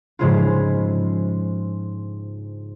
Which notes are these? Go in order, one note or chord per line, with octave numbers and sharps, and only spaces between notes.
G#2 C#3 F3 G#3 E4 F4